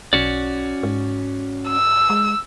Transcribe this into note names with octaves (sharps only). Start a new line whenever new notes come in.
B1 C#4 F#4 D5
G#2
E6
G#3